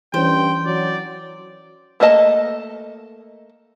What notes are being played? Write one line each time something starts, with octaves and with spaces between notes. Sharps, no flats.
G2 E3 C#4 C5 G5
F#3 D5
A3 A#3 A4 D#5 A5